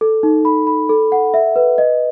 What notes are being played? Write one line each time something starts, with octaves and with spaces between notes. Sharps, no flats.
A4
D#4
B5
B5
A4
F#5
E5
B4
D#5